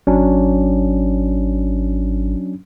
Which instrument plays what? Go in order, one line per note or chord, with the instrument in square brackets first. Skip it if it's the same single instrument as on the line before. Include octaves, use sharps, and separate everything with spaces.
[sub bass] G#1 [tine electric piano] F#3 C#4 D4